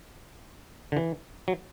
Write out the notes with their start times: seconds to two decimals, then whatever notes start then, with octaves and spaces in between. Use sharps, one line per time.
0.92 D3
0.97 E3
1.48 F#3